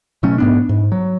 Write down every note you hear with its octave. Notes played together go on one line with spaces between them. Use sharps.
B2 F#3 A3 C#4
G#2 B3 D4
G#2
F#3